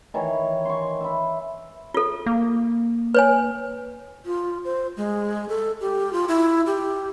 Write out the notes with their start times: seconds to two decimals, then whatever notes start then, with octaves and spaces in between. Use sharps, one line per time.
0.14 D#3 E3 C#5
0.65 C6 C#6
1.00 E5 B5
1.94 F4 A4
2.26 A#3
3.14 B4 C#5 G#5
4.26 F4
4.64 C5
4.97 G#3
5.49 A4
5.81 G4
6.13 F4
6.28 E4
6.66 G4